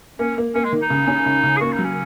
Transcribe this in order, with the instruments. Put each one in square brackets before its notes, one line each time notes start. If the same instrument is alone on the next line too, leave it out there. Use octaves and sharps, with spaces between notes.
[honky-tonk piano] A#3 [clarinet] C#4
[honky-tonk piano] A#3
[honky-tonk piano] A#3 [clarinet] C#4
[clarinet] G#3
[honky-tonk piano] D#3
[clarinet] D#4
[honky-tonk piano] C#3
C#4
C#3
C#3
[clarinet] G#4
[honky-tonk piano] A#3 [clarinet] F#4
[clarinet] D#4
[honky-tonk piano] F#3
[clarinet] C#4